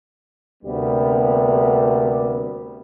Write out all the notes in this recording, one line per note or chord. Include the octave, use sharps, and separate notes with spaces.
D2 C3 G3 A#3 B3